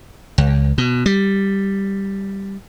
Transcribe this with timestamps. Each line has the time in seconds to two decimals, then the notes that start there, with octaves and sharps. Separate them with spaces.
0.38 C#2
0.78 B2
1.06 G3